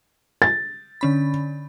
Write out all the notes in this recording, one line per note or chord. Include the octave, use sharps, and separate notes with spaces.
A6
D3 C#4 B5